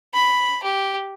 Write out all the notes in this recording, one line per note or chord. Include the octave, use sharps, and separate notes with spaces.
B5
G4